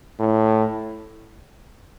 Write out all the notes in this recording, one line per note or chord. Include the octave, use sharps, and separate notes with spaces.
A2